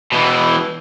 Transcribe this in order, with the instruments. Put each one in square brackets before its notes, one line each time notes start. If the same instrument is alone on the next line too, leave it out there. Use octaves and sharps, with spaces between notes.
[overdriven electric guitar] B2 E3